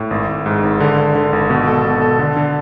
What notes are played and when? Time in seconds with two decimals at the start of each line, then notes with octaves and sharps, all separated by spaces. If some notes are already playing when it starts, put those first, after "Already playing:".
Already playing: A2
0.11 G#1
0.29 G#1
0.46 G#2
0.63 G#1
0.80 D3
0.98 D3
1.15 D3
1.33 G#1
1.50 B2
1.68 A4
1.85 B2
2.02 A4
2.19 D3
2.37 D3